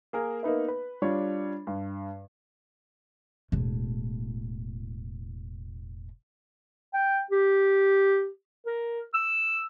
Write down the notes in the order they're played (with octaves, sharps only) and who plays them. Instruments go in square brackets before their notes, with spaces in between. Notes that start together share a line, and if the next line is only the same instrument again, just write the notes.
[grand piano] A#3 G#4 A#4
A#3 B3 D#4 B4 E5
B4
G3 D4 F4 C#5
G2
[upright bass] E1 A2
[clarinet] G5
G4
A#4
E6